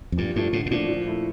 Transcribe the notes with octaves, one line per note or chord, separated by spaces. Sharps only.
F2
G2 A#2
G2 F3 A3
A2 D3
A2
A#2 F3 A3 D4
F3
A3 E4